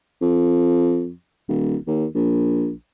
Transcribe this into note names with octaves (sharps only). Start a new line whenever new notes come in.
F2
D#1
D#2
A#1